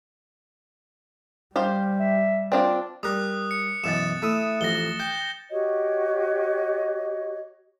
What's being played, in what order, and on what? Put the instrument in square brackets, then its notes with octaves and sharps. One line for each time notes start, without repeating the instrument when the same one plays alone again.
[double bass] G3 [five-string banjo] G4 C5 F5
[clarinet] E5
[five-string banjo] C4 D4 F4 [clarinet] D5
[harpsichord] G3 A#4 [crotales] D#6 F#6
[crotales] C#7
[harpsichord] F#2 B2 E3 [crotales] A6 E7
[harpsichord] A3 E4 D#6
[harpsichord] A1 F2 [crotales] A#6 G7
[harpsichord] G5 [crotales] G6
[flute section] F#4 G4 C#5 D#5